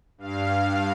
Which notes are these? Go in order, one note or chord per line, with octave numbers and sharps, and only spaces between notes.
G2 F5